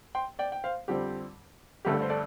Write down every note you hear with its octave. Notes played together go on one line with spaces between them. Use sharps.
G5 C6
D5 G5
G5
C5 F5
F2 D3 G3 C4 G4
G1 G2 D3 A3 G4
A4
C5
A4 D5